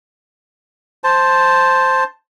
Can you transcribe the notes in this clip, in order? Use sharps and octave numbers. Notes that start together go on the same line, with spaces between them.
C5 A5